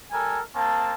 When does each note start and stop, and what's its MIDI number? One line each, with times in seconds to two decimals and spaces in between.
0.12 0.40 55
0.12 0.40 69
0.12 0.40 70
0.12 0.40 80
0.55 0.93 58
0.55 0.93 60
0.55 0.93 81